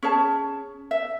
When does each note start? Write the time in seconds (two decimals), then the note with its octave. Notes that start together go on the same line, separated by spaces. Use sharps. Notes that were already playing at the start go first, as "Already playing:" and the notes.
0.03 C#4 G#4 C#5 A5
0.91 E5